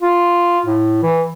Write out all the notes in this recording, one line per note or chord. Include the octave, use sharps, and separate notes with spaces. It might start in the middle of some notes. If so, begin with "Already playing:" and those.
F4
A2
E3